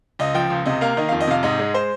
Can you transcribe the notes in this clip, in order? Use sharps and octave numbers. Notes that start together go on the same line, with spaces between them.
C#2 D#5
F3 G5
C#2
C3 D#5
A#3 F5
D#3 D#5
F2 F5
D#5
C3 F5
G#2 D#5
G#3
C5